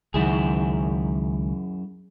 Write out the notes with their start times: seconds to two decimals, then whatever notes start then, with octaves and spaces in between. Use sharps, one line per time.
0.14 C#2 F#2 D#3 E4 G#4